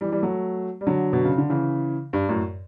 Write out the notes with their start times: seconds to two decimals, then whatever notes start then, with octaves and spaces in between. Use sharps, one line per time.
0.01 E3 G3
0.12 E3 G3
0.22 F#3 A3
0.81 G3
0.87 D3 F#3
1.13 B2
1.25 C#3
1.38 D3
1.50 C#3 E3
2.13 G2
2.29 F#2 A2